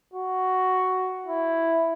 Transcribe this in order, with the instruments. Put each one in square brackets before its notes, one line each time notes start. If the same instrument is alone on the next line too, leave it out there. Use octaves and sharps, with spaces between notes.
[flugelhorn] F#4
E4